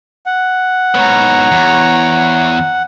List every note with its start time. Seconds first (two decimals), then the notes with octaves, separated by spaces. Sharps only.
0.26 F#5
0.95 G#2 B2 C#5 A#5
1.52 E2